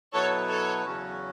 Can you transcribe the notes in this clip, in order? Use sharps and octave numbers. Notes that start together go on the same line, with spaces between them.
B2 F#3 B3 E4 A4 B4 C#5
A4 C#5
E2 C#3 F#3 C#4 F#4